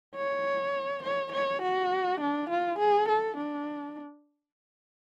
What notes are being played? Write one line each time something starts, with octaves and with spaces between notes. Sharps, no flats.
C#5
C#5
C#5
F#4
D4
F4
G#4
A4
D4